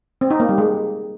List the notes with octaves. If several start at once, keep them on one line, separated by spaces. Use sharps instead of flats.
C4
D#4
A#3
G3
G#3